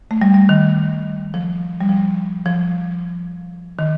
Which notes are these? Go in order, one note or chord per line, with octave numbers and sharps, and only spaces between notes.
A3
G3
G3
D#3
F3
G3
F3
F3
D#3